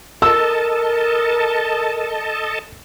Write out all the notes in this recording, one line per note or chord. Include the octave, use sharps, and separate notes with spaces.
A4 A#4 D#5 A5 E6